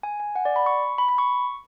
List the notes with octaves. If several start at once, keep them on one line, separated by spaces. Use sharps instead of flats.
G#5
G#5
F#5
D5
B5
C#6
B5
B5
C#6